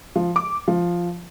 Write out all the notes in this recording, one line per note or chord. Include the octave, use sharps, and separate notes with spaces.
F3
D6
F3